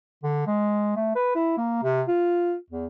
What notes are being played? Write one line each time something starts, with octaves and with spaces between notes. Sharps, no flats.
D3
G#3
A3
B4
E4
A#3
C3
F4
E2